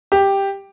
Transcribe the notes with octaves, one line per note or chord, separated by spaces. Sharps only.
G4